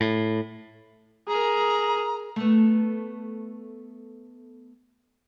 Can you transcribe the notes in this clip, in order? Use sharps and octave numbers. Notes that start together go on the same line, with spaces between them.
A2
G#4 A#4 A#5
A3 B3